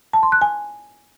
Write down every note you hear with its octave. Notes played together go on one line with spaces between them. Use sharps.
A5
C6
F#6
G#5